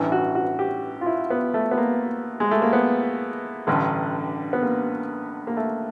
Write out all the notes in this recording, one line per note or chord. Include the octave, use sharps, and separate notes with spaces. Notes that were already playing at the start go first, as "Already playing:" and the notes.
Already playing: A1 G2 E3
F#4
F#4
G4
F4
E4
B3
A3
B3
A#3
G#3
A3
A#3
B3
A1 G2 D3
B3
A#3
A#3
A3